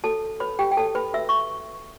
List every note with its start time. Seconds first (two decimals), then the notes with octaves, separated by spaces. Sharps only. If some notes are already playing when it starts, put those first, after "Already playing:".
0.04 F#4 A4 C#5 A5
0.40 F#4 B4 C#5 B5
0.59 G4 G5
0.71 G5
0.77 F#4 A4 C#5 A5
0.95 B4 B5
1.13 F#4 E5 E6
1.17 C#5
1.29 C#6